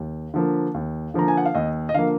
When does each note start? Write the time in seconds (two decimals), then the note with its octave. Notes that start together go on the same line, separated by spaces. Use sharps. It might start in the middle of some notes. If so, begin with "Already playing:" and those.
Already playing: D#2
0.34 D3 F3 A#3
0.74 D#2
1.14 D3 F3 A#3 A#5
1.28 G#5
1.37 F#5
1.45 F5
1.55 D#2 D#5
1.89 D#5
1.94 D3 F3 A#3 F5